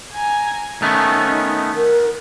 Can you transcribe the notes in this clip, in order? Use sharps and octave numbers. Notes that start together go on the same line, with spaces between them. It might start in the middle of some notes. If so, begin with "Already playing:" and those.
G#5 A#5
D#3 A3 B3 C#4 D#4
A#4 F#5